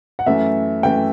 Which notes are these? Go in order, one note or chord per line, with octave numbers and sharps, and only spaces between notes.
F#5
F#2 E3 A3 E5
F#2 E3 A3 G5